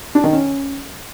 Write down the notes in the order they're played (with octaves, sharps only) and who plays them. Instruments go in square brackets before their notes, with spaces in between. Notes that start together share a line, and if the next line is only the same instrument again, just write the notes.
[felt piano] D4
D#3
C#4